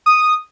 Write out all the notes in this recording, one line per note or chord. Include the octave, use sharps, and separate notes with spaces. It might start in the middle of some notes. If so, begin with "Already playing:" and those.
D#6